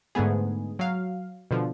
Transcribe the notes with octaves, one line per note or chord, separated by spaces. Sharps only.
G#2 D3 A3 B3 G#4
F#3 F5
B2 D3 F3